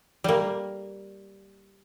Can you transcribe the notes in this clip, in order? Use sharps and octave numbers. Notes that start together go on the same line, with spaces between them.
G3 A#3